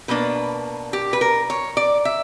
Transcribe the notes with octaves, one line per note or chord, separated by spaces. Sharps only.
B2 A#3 D4 B4
G4
B4
A#4
C#5
D5
E5